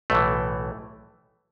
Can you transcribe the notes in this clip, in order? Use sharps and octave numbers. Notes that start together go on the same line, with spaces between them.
B1 A2 E3 A3